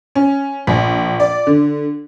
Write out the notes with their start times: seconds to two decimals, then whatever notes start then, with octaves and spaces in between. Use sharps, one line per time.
0.15 C#4
0.67 A#1
1.20 D5
1.47 D3